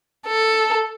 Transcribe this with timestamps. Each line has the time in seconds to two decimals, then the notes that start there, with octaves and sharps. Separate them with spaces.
0.27 A4